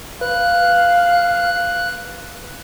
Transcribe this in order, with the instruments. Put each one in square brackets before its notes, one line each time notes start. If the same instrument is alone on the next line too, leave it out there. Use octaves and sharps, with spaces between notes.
[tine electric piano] B4 [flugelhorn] F5 [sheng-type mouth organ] F#6